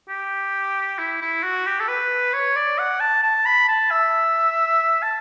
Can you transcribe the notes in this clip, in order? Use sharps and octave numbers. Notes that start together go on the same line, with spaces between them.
G4
E4
E4
F#4
G4
A4
B4
C#5
D5
F#5
A5
A5
B5
A5
E5
A5